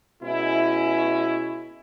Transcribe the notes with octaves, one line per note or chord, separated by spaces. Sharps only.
B2 G#3 C#4 E4